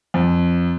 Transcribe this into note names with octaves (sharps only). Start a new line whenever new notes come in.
F2